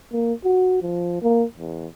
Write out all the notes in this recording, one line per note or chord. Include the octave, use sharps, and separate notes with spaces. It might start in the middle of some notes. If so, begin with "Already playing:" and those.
A#3
F#4
F3
A#3
E2